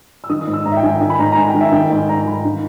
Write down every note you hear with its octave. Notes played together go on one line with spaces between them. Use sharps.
E6
D#3 D#6
D#6
G#2
E6
G#2 A#5
E5
G5
D#3 G#5
G5
D#3 G#5
B5
G#2 A#5
A#5
G#2 G#5
G5
D#3
E5
D#3 G5
G#2
G#5
G#2 A#5
D#3 B5
D#3